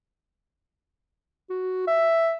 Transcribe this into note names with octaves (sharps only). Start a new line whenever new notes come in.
F#4
E5